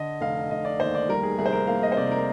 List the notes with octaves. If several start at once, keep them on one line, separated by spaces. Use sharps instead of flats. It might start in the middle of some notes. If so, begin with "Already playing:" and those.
Already playing: D3 D#5
F1 F5
F1 D#5
D5
D#2 C5
D5
G3 A#4
G#4
C2 G#4
C5
A#4
A#3 F5
D#5
C5
C3 D5
A#4